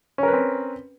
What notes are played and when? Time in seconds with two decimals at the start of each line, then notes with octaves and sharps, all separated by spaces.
0.18 C#4
0.23 A#4
0.28 B4
0.33 C4